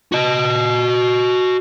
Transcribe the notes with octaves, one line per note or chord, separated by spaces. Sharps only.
F#4 D#5